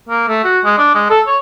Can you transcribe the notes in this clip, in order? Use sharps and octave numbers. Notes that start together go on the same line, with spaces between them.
A#3
A3
F#4
G#3
D4
G#3
A4
C#5